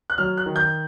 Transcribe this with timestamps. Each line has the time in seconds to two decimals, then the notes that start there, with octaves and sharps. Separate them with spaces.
0.10 F#6
0.18 F#3 F6
0.38 F#6
0.46 D#3
0.56 G6